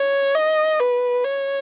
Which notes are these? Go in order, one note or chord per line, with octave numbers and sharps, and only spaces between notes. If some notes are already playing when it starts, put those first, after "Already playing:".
Already playing: C#5
D#5
B4
C#5